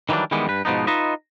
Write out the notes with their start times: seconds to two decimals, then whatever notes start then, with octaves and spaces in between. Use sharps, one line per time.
0.09 D#3 E3 F#3 G3 D4
0.31 D#3 E3 G3 G#3 B3
0.47 G2 B4
0.65 G#2 B2 F3 B3 D#4
0.87 D#4 F4 B4 D#5 E5